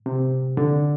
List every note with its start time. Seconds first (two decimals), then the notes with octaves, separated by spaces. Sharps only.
0.06 C3
0.57 D3